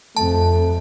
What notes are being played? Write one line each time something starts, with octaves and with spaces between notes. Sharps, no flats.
F2 A3 A5